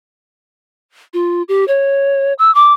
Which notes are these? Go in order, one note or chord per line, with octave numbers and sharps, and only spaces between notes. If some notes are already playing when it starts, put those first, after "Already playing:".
F4
G4
C#5
E6
D6